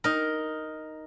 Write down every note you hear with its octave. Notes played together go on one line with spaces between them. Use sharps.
D#4 A#4